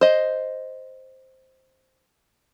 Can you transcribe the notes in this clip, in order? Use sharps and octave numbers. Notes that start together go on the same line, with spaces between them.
C5 D#5